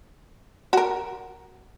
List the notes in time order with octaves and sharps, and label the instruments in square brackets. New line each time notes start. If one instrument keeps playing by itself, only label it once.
[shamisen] F#4 A#4